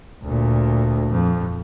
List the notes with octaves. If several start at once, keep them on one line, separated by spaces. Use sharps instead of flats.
D2 A#2
F2